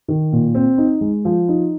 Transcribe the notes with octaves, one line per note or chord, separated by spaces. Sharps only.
D#3
A#2
C4
D#4
G#3
F3
D#4